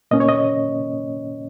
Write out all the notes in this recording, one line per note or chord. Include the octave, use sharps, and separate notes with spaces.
A#2 A#3 C#4 D#5
C#5
D#5